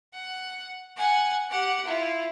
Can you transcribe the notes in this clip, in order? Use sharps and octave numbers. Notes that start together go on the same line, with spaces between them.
F#5
F#5 G#5
G4 F#5
E4 F4